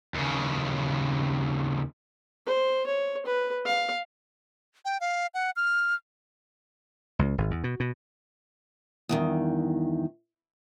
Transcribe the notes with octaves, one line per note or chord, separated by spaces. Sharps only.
D#2 C#3
C5
C#5
B4
F5
G5
F5
F#5
F6
C#2
G#1
E2
B2
B2
E2 G2 D#3